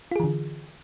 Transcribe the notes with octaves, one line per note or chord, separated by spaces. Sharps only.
D3 E3 F4 G#4